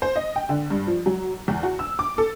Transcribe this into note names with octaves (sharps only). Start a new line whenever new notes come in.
C5
D#5
G5
D3
G2
F3
F#3
E2
F#4
E6
D6
A4